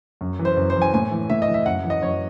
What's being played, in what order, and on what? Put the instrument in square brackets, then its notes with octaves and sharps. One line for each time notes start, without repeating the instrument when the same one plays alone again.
[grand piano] F#2
E3
C5
F#2
C5
E3
G#5
A2 G#5
E3
A2 E5
D#5
E3
E5
F#2 F#5
E3
D#5
F#2 C#5